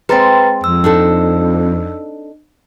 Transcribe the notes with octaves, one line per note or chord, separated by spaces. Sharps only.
G#3 C4 B4 A#5 A6
F2 E6
D4 D#4 A4